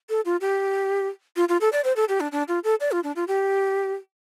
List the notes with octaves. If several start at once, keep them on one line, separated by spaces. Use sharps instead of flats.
A4
F4
G4
F4
F4
A4
D5
C5
A4
G4
D4
D4
F4
A4
D5
F4
D4
F4
G4